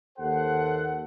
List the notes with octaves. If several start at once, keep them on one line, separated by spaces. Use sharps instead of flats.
D#2 A4 C5 F#5